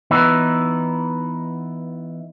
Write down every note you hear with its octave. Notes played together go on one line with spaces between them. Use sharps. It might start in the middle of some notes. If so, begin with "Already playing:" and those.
E3 B3 D#4 E4